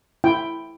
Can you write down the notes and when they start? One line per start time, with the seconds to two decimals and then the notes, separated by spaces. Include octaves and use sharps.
0.24 E4 G5